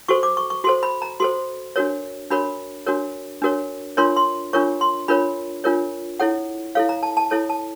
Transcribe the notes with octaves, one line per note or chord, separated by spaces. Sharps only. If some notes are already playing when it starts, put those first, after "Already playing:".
F#4 A4 C5 C#6
D6
C#6
C#6
F#4 A4 C5 C6
B5
A#5
F#4 A4 C5 C6
D4 F#4 A#4 C#5
D4 F#4 A#4 C#5 B5
D4 F#4 A#4 C#5
D4 F#4 A#4 C#5
D4 F4 A#4 C#5 C6
C6
D4 F4 A#4 C#5 C#6
C6
D4 F4 A#4 C#5 B5
D4 F4 A#4 C#5
E4 A4 C#5 F#5
E4 A4 C#5 F5
A#5
A5
A5
E4 A4 C#5 A5
A5